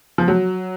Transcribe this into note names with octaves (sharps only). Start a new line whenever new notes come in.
F3
F#3